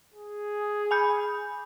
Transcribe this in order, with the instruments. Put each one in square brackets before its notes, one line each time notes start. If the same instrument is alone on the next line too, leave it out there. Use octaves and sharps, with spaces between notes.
[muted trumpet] G#4
[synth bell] G#5 B5 G6